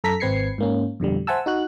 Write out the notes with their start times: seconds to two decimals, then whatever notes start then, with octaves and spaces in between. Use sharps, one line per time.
0.04 F#2 A4 A#5 B6
0.20 G#1 C4 B4 G#6 C7 C#7
0.58 G#2 A#3 C#4
1.00 F2 B2 D3 G3
1.27 C5 E5 F#5 G#5 A5 E6
1.46 D#4 F#4 F#6